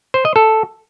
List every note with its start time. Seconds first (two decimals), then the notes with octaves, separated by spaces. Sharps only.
0.14 C5
0.25 D#5
0.36 A4